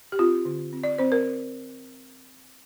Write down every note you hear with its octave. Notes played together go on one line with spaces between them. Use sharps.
G4
C4 F4
D3
C4
D5
C4 C5
A#4